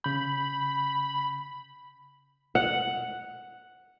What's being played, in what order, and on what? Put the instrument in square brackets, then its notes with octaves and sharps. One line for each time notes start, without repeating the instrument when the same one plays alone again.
[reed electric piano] C#3 G6 [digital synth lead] B5
[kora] F#5